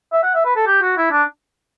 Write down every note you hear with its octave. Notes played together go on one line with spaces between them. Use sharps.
E5
F#5
E5
B4
A4
G4
F#4
E4
D4